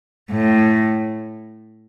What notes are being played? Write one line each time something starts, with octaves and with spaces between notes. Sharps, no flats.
A2